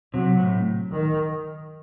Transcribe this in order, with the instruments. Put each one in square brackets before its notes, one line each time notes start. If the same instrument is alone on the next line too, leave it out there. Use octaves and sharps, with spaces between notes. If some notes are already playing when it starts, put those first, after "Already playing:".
[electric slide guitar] C3 [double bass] F#3
[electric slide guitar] A2
[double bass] D#3